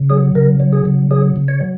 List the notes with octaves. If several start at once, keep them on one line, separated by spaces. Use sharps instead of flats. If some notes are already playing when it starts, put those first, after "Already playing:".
Already playing: C#3
F#3 G#4
C#3 A#4
F#3
G#4
C#3
F#3 G#4
C#3
C#5
F#3